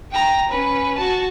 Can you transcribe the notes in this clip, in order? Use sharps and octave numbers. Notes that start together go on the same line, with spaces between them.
G5 A#5
C#4 B4
F#4 A5